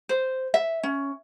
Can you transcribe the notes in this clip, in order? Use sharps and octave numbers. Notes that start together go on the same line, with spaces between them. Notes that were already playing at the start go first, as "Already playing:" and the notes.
C5
E5
C#4